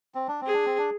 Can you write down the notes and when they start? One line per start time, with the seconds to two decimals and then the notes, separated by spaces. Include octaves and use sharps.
0.15 C4
0.28 D4
0.41 C4
0.47 G#4
0.53 D4
0.65 C4
0.78 D4